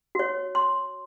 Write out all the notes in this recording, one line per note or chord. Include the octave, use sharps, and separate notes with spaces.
F#4 C#5
C6